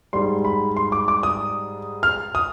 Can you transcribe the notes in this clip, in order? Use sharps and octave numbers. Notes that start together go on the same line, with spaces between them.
G#2 G3 C6
B5
C6
D6
D6
D#6
F6
D#6